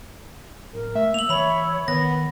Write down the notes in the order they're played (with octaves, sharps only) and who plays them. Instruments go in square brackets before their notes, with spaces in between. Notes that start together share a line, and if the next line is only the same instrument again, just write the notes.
[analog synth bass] D1 [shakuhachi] A#4
[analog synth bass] A3 [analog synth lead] E5
[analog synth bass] A#3 [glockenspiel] F7 F#7
[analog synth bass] E3 [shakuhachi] C#5 [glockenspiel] B5 F7
[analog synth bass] D#3 [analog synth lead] B3 [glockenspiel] A#6